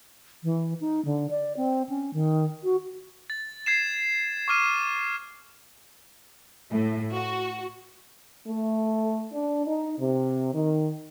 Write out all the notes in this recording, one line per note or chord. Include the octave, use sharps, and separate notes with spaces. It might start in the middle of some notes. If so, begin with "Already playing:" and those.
E3
D#4
D3
D5
C4
C#4
D#3
F#4
A6
G#6 C7 E7
C#6 D6 F6 D#7
A2
F#4
A3
D4
D#4
C3
D#3